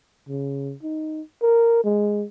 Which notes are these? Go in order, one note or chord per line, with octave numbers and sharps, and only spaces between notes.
C#3
D#4
A#4
G#3